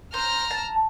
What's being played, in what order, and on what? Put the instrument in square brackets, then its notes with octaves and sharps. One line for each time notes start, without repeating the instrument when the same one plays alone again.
[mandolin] C5 [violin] A#5 F6
[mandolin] A5